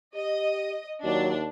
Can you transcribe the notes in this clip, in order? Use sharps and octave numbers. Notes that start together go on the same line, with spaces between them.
G4 D#5
D#2 F#3 D4